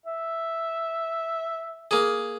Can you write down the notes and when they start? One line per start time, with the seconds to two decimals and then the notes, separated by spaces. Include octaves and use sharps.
0.06 E5
1.91 A#3 G#4